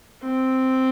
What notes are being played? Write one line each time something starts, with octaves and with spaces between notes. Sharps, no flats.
C4